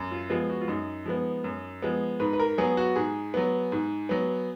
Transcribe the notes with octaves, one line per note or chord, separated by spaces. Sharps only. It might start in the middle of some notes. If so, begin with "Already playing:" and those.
Already playing: F#2
F4
F3 G#3 B3 F4
F#4
F4
F#2 D#4
F3 G#3 B3
F#2
F3 G#3 B3
G#2 B4
B4
A#4
F#3 B3 G#4
F#4
G#2 G#4
F#3 B3
G#2
F#3 B3